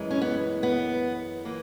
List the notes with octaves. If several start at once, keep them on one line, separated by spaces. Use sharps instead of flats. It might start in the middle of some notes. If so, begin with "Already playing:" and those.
Already playing: F#2 E3 G#3
C#4
B3
B3
E3 A#3